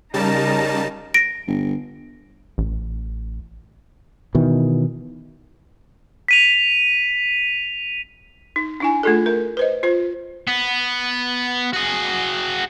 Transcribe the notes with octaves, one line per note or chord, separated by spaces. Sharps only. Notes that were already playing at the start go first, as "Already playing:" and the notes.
C#3 G3 D#4 A#4 A5
A#6 D7
G1
A1
B2 D#3 E3
B6 D#7 F7
D#4
D4 E4 G#5
A3 D4 F4 G#4 A4
A#4
B4 C5 D#5
F4 C5
B3
F#4 G#4